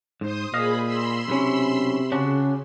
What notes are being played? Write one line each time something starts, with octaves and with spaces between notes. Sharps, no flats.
G#2 C5 D#6
A#2 G#4 D#5 F5 B5
B5 C6 E6
B1 C3 C#4
C#3 C#4 D4 F#4